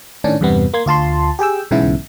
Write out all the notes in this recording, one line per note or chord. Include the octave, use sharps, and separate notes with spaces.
A2 D#3 C#4 D4
E2 G2 C3 G3 B3
A#3 C6 G#6
D2 F4 A5 C6
G4 G#4 G5 E6
B1 G#2 C#3 E3 B3 E4